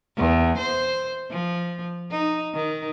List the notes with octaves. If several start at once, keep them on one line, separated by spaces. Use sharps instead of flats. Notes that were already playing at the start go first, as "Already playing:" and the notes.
E2
C5
F3
D#4
D#3